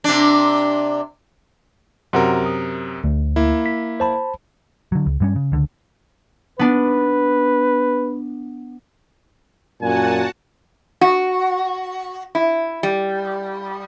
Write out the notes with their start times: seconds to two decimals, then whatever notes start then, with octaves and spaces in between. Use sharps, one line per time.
0.04 C3 D4
2.13 F#2 C3 F#4 A#4 F#5 C6
2.46 D#6
3.04 D2
3.36 A#3 E4
3.66 B6
4.00 C5 A5 B5
4.92 D3 F#3
5.06 C#2
5.20 G2 G3 C#4
5.36 C#3
5.52 C#2 D3
6.59 B3 D4 B4
9.82 F#2 A#2 F#4 F#5 G#5 A5
11.01 F#4
12.35 E4
12.83 G3